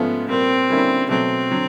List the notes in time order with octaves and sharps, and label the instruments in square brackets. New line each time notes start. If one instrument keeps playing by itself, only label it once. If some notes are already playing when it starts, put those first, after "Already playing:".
Already playing: [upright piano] G#2 F3 A3 C#4 F4 [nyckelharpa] B3
[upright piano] A#2 G3 A#3 [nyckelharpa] C4
[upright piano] D3 G3 A#3 C#4 E4
[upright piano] B2 F#3 A3 [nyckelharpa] C4
[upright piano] D3 F#3